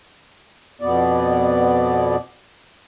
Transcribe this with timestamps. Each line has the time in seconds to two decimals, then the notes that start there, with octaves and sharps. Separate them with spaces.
0.81 F2 B2 B3 D5